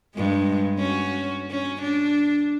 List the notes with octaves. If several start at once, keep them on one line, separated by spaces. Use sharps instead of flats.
G2 G#3
C#4 F#4
C#4
D4